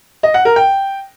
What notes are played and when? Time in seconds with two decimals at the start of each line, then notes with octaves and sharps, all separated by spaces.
0.23 D#5
0.34 F#5
0.45 A#4
0.56 G5